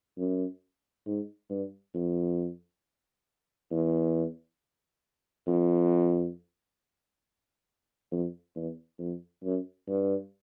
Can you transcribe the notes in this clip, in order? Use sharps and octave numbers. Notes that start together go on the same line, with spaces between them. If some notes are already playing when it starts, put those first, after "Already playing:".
F#2
G#2
G2
F2
E2
F2
F2
E2
F2
F#2
G2